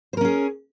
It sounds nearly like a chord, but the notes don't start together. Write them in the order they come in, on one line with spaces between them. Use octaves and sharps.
C5 A#4 C#4 G#4